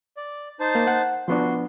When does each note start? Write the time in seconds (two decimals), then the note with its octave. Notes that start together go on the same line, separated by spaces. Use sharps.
0.17 D5
0.60 D#4 C5 A5
0.75 A#3
0.87 F#5
1.28 F3 B3 D4 F#4 C6